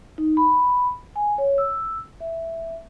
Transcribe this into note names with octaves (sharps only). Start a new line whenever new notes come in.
D#4
B5
G#5
C#5
E6
E5